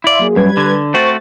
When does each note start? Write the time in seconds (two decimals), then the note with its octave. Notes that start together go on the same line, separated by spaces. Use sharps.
0.04 E4 D5 E5 F5 C6
0.19 F#3 A#3 G#4
0.36 F#2 G3 B4 G#6
0.57 D3
0.94 A3 C4 F#4 C5 C#6 A6